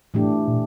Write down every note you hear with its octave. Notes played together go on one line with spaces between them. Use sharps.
A2 E3 A3 D4 G4
A#2